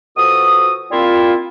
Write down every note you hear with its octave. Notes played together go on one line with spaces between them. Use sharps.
B2 F3 F#4 A4 D#6
G3 A#3 C4 E4 F4